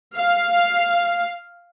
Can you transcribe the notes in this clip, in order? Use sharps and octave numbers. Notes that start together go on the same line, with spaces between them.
F5